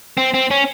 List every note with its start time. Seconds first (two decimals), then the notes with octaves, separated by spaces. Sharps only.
0.18 C4
0.34 C4
0.51 C#4